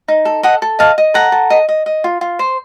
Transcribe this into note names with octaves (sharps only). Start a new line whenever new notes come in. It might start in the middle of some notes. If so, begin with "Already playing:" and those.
D#4
A4
A4 D#5 F#5
A4
D#5 F5 A5
D#5
A4 F#5 A#5
A4
D#5
D#5
D#5
F4
F4
C5